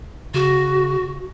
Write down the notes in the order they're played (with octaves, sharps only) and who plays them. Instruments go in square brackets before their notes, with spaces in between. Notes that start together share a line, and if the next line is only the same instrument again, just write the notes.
[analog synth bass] C#3 [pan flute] F#4